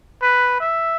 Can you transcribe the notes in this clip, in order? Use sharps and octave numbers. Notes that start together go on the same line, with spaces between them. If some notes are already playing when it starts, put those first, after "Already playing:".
B4
E5